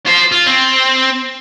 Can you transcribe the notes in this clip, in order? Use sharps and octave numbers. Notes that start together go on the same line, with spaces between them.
F4 C5
F4
C4